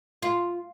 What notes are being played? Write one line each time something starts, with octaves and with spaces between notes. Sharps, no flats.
F4